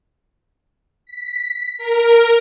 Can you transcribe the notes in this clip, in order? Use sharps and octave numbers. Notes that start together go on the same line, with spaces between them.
B6
A#4